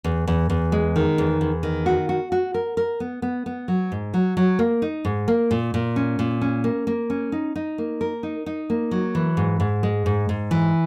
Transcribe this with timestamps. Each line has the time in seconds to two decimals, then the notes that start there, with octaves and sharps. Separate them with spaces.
0.04 E2
0.27 E2
0.50 E2
0.72 G#3
0.96 D#3
1.18 E2
1.41 E2
1.63 D#3
1.86 F#4
2.09 F#4
2.32 F#4
2.54 A#4
2.77 A#4
3.00 B3
3.22 B3
3.46 B3
3.68 F#3
3.92 G#2
4.14 F#3
4.37 F#3
4.59 A#3
4.82 D#4
5.05 G#2
5.28 A#3
5.51 A#2
5.74 A#2
5.96 C#4
6.19 A#2
6.41 C#4
6.64 A#3
6.87 A#3
7.10 C#4
7.32 D#4
7.56 D#4
7.78 A#3
8.01 A#4
8.23 D#4
8.46 D#4
8.70 A#3
8.91 F#3
9.15 E3
9.37 G#2
9.60 G#2
9.83 G#3
10.06 G#2
10.29 G#2
10.51 E3